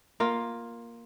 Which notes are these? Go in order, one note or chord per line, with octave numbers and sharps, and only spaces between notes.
A#3 F4